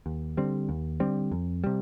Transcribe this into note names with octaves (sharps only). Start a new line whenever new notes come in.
D#2
D3 G3 C4
D#2
D3 G3 C4
F2
C3 G3